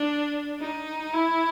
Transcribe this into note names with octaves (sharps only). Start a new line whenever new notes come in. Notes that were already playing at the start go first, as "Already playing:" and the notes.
Already playing: D4
D#4
E4